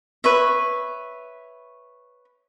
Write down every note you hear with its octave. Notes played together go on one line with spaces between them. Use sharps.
B4 C#5 E5